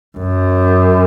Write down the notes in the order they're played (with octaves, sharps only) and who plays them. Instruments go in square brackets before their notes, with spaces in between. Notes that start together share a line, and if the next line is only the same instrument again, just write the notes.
[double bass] F#2